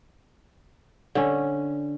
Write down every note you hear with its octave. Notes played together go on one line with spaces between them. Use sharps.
D3 C#4